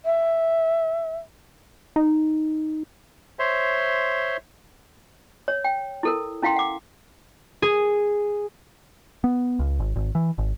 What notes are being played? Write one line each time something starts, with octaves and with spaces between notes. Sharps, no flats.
E5
D#4
C5 C#5 E5 C6
C#5
G5
E4 A4 A#4
C#4 E4 F5 G5 C6
F#5 D6
G#4
B3
C#2
G#1
G#1
E3
G#1